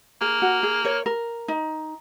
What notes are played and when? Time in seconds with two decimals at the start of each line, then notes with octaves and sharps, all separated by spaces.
0.21 A#3 G#4
0.42 F#4
0.63 G#4
0.85 A#4 C#5
1.06 A#4
1.48 D#4